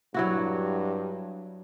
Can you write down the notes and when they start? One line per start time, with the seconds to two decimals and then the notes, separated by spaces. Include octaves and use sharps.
0.14 G2 F#3 E4 F#4